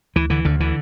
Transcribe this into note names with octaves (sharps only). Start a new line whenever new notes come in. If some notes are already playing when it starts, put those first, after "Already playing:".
D2 E3
D3 E3
D2 D3
D3 E3